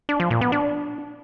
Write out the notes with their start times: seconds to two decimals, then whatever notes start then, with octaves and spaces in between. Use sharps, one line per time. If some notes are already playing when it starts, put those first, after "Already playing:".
0.09 D4
0.20 F3
0.31 A#2
0.41 B3
0.52 D4